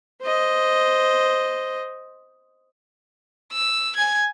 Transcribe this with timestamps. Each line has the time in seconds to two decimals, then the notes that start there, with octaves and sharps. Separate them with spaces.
0.22 C5 D#5
3.52 E6
3.96 G#5 G#6